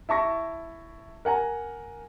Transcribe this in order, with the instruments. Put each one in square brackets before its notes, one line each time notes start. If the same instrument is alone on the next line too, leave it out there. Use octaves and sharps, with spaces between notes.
[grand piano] E4 A5 C#6 A#6
A#4 F#5 G#5 A#5